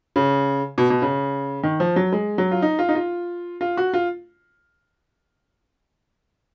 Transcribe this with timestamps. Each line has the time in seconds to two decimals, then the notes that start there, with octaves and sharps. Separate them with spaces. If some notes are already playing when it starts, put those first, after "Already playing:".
0.16 C#3
0.78 B2
0.90 B2
1.02 C#3
1.63 D#3
1.80 F3
1.96 F#3
2.12 G#3
2.38 F#3
2.51 F4
2.62 D#4
2.79 F4
2.89 D#4
2.95 F4
3.61 F4
3.77 F#4
3.94 F4